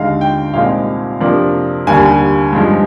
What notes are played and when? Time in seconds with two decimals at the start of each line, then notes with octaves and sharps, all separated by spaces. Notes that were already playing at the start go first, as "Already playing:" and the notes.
Already playing: D#2 D3 G#3 D#4 F5
0.21 G5
0.54 C2 A#2 G#3 C4 D#4 F5
1.20 F2 C3 F3 A#3 D4
1.86 D#2 D3 G3 A#3 G#5
2.53 G2 F3 G#3 D#4